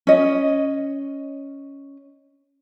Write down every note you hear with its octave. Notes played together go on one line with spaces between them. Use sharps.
C#4 D#5